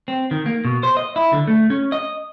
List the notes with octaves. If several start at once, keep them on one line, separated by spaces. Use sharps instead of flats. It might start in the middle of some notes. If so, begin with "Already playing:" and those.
C4
D#3
A#3
B2
C5
D#5
E4
D3
A3
C#4
D#5